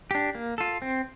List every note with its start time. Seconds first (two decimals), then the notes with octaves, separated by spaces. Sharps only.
0.11 D4 G4
0.35 A#3
0.58 F4 A4
0.82 C4